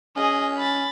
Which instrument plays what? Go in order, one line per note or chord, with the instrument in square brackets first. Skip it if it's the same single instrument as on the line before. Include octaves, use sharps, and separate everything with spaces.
[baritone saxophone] C#4 [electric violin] G#4 D#5
[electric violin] B5 A6